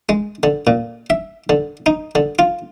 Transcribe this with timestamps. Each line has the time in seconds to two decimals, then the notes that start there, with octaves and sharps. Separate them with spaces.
0.09 G#3
0.43 D3
0.67 A#2
1.10 E5
1.49 D3
1.86 D#4
2.15 D3
2.39 F4